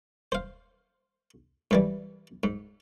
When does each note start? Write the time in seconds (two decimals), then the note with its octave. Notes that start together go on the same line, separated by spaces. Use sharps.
0.32 C5 F5
1.71 G#2 E3 G3
2.43 G#2